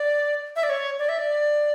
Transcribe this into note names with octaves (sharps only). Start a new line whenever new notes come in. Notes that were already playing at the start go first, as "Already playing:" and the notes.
Already playing: D5
E5
D5
C#5
D5
E5
D5